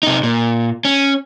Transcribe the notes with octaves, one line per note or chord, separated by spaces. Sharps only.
C3 D#4
A#2
C#4